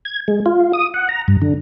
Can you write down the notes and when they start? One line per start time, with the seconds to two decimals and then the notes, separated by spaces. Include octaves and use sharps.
0.05 G#6
0.28 G#3
0.46 F4
0.73 D#6
0.94 F#5
1.09 A#5
1.28 G2
1.42 D3